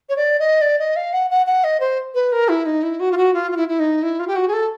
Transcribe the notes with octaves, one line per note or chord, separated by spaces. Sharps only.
C#5
D5
D#5
D5
D#5
F5
F#5
F#5
F#5
D#5
C5
B4
A#4
E4
D#4
E4
F#4
F4
F#4
F4
F4
E4
E4
D#4
E4
F4
G4
F#4
G#4
A4